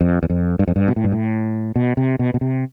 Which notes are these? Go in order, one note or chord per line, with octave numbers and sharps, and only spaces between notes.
F2
E2
F2
G2
F2
G2
B2
A2
G2
A2
B2
C3
B2
B2
C3